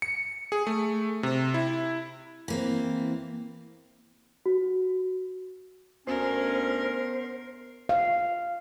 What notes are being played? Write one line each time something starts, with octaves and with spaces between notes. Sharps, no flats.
C#7
G#4
A3
C3
E4
E3 A#3 C4
F#4
D2 B3 C#4 A#4 C5
F5